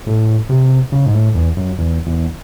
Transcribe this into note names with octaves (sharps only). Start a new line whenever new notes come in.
A2
C3
C#3
G#2
A2
E2
F#2
E2
E2